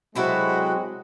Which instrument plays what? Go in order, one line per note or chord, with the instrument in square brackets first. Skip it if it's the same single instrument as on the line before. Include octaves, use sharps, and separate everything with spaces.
[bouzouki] C3 E4 A4 [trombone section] F#3 C4 [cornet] G#3 [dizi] F#4